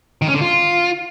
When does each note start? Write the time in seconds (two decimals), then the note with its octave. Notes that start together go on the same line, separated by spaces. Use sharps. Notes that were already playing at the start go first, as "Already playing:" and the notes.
0.22 D#3
0.28 C#4
0.35 D3
0.41 F4